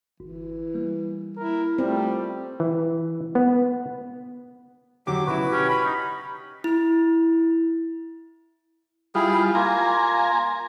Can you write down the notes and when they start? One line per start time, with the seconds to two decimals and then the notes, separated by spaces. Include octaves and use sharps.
0.20 G1 E3
0.75 G3 A#3
1.37 E4 A#4
1.78 G3 A3 C4 F4
2.60 E3
3.35 B3
5.07 F2 D3 F#3 G4 D6
5.27 B1 C#3 E4 F#4 B4
5.52 C#4 G4
5.69 B5
5.85 D#4
6.64 E4
9.15 G3 E4 F4 G#4
9.55 A#3 F4 G#5 A#5